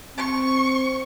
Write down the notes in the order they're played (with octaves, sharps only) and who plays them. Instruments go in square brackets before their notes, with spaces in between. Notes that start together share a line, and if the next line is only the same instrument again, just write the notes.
[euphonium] C4 [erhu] C#6